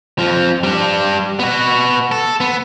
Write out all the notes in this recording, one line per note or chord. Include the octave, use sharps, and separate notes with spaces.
F2 F3
G3 D4
B3 F#4
A4
B3